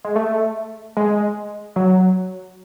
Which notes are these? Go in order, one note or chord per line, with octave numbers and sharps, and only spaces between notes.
G#3
A3
G#3
F#3